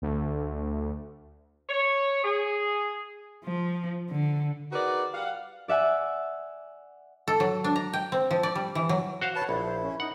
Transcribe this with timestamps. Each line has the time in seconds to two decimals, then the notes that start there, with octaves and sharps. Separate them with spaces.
0.02 D2
1.70 C#5
2.24 G#4
3.44 F3
4.10 D3
4.72 D#4 F#4 G#4 A#4 B4 D5
5.14 G3 F5 F#5
5.68 D5 E5 F#5 G#5
7.28 A4
7.40 F#3
7.64 D4
7.76 A#5
7.93 G5
8.12 C4
8.31 F3
8.43 D5
8.55 G3
8.75 E3
8.89 F#3
9.21 F#4 C5 F5 F#5
9.36 B4 C#5 A5
9.49 A#1 E4
9.65 C5
9.82 C#4
10.00 D#4 F#5